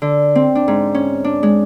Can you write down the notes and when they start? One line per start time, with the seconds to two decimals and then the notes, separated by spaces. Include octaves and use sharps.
0.02 D3
0.35 C4
0.55 D4
0.68 G#2
0.95 C#4
1.24 D4
1.43 G#3